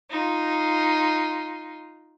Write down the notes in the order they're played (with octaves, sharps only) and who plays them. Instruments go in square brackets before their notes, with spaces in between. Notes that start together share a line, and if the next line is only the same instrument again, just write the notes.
[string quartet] D#4 F4